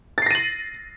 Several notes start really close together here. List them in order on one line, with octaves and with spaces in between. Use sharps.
A6 C7 A#6 D#7 F#7